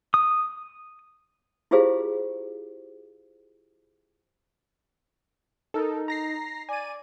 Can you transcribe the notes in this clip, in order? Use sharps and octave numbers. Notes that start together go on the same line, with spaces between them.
D#6
E4 F4 G4 G#4 C5 F5
D#4 A4 A#4
A#5 A#6 C7
D5 G#5 D#7